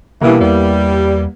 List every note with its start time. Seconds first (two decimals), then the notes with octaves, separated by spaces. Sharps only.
0.22 G2 B2 E3 A#3 B3 E4
0.40 E2 G3